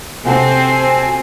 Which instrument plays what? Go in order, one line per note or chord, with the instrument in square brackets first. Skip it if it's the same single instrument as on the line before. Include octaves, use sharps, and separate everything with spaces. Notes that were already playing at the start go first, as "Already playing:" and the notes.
[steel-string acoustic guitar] C3 F#4 A4 [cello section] C4 [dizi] G#5